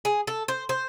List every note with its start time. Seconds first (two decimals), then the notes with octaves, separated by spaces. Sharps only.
0.05 G#4
0.27 A4
0.48 C5
0.69 C5